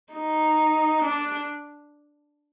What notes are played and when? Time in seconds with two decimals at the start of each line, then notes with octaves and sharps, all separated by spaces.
0.13 D#4
1.05 D4